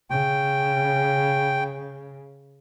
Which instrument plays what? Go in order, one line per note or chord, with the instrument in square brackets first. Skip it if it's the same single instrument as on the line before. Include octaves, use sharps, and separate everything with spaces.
[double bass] C#3 [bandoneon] G5